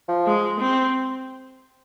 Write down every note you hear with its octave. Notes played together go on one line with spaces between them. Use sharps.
F3
G#3
C4